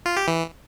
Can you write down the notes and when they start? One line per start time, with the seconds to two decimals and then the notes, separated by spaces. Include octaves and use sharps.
0.06 F4
0.17 G4
0.28 E3